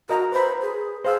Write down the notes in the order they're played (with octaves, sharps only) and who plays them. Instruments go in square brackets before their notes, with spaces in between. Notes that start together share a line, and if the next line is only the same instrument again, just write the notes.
[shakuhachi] F#4 [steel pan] A#4 D#5 A#5
[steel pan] B4 B5 [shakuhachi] C5
[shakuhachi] G#4
[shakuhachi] G#4 [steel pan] C5 F5 E6